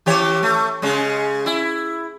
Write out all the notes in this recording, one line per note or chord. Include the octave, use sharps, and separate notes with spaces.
E3 G4 C#5
A3
C#3 G#3
E4